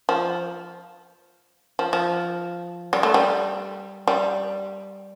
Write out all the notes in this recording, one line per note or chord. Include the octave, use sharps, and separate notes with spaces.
F3
F3
F3
G3
A3
G3
G3